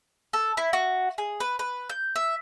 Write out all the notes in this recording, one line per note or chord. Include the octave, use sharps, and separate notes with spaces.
A4
E4
F#4
G#4
B4
B4
G6
E5